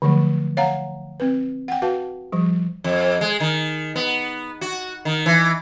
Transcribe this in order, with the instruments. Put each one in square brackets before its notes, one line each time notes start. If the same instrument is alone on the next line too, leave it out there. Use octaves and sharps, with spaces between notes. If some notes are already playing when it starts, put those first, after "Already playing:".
[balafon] D3 F3 F#3 A3
C#5 F5 F#5 A#5
C4 B4
F#5 G5
F#4 B4 F5 A5
F3 G3
[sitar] F2
G#3
D#3
B3
F#4
D#3
E3